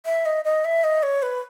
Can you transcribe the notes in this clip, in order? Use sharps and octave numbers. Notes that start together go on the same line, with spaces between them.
E5
D#5
D#5
E5
D#5
C#5
B4